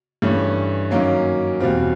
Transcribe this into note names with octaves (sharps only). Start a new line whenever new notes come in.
G2 E3 A3 C#4
F#2 D#3 F#3 A#3 C#4
E2 B2 G3 C4 F4